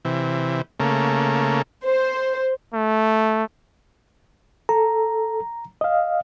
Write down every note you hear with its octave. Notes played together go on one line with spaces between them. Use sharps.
C3 E3
C#3 A3 A#3
C5
A3
A4 A#5
D#5 F5